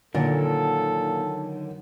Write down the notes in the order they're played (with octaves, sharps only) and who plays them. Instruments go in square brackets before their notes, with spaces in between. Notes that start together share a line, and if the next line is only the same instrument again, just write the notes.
[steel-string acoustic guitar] A#2 [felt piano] D3 [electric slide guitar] D#3 F#3 [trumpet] A4